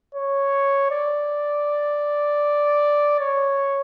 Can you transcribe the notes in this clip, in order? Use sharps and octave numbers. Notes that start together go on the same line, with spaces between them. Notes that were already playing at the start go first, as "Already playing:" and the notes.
C#5
D5
C#5